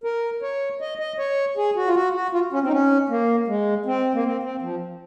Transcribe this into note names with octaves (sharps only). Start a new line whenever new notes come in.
A#4
C#5
D#5
D#5
C#5
G#4
F#4
F4
F#4
F#4
F4
C#4
C4
D#4
C#4
A#3
G#3
C4
A#3
C4
C4
F3